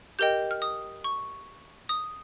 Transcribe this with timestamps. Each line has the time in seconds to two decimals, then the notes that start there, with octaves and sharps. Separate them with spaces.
0.19 G4 A#4 D#5 G5 G6
0.51 F6
0.62 D#6
1.04 C#6
1.89 D#6